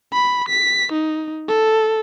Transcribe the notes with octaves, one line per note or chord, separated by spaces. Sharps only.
B5
B6
D#4
A4